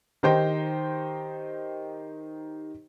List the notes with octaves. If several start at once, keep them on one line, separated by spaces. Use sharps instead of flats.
D#3 D#4 G4 C5 D#5 G5